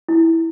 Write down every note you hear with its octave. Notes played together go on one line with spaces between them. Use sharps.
E4